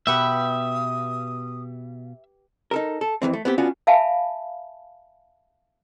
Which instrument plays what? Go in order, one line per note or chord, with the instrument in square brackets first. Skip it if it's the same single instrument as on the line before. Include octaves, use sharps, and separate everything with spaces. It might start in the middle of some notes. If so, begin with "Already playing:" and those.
[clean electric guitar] B2 B3 [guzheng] G4 B4 F#5 [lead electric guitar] E5 [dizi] D#6
[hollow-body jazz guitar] D#4 A4 A#4
A4
F2 A2 E3 C4
A3
B3 C4 G4
B3 C#4 D4 F4 F#4
[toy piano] E5 F5 G#5 A5 B5